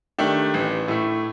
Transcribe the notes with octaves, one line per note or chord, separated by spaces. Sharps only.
D#3 A3 D4 G4
A1
A2 A3